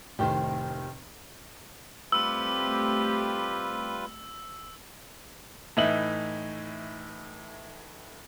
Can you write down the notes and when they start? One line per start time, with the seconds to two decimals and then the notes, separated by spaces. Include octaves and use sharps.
0.19 F1 A2 D#3 G4 C5
2.12 G3 A3 C4 F4 G4 B4 E6
5.77 A2 E3 D#4 E5 F#7